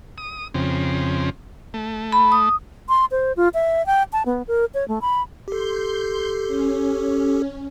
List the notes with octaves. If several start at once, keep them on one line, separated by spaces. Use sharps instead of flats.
D#6
F2 C#3 C4
A3
B5
D#6
C6
C5
F4
E5
G5
A5
B3
A#4
C#5
A3
B5
G4 A4 C6 G6
C#4